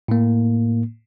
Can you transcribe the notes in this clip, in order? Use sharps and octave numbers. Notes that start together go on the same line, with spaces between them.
A2 A#3